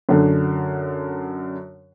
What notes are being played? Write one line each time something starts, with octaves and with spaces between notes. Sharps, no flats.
F#2 D3